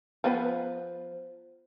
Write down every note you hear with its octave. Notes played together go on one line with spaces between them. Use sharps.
F3 B3 B4